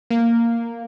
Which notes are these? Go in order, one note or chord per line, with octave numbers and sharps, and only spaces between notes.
A#3